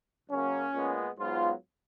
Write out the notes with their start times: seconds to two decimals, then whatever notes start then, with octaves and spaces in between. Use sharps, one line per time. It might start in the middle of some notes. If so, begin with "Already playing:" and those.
0.30 F#2 C#3 F#3 A#3 C#4
0.74 A#2 G#3 B3
1.18 G#2 F#3 B3 F4